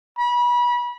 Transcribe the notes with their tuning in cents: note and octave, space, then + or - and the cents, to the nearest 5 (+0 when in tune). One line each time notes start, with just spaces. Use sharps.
B5 -30